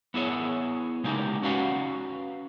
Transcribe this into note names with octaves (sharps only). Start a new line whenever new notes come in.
B3 E4 G#4 C#5
C#3 G#3 A#3 D#4 G4
C#4 F#4 B4 F5 F#5